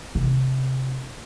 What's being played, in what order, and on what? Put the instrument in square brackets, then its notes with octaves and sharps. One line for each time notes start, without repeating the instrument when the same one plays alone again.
[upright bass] C3